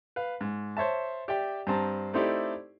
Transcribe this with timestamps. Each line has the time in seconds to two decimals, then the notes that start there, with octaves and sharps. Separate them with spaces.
0.16 B4 F5
0.41 G#2
0.77 C5 C#5 E5 A5
1.28 G4 D5 E5 G5
1.67 G2 C4 A5 A#5
2.13 A3 C4 D#4 E4 G4 D5